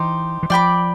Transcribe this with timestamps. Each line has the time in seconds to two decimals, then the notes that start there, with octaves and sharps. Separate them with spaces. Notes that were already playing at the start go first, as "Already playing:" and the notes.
Already playing: E3 D#4 G4 C5
0.43 E3
0.50 F3 D5 G5 B5 D6